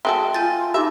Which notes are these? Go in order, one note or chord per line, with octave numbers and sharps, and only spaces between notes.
G#3 F#4 A4 E5 G5 C6
F4 G#5 G6 A6
D#4 F4 G4 E5